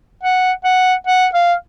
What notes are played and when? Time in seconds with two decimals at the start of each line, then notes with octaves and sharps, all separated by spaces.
0.23 F#5
0.64 F#5
1.07 F#5
1.34 F5